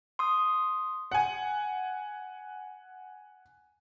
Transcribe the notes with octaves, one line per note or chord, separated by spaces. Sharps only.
C6 D#6
F#5 G#5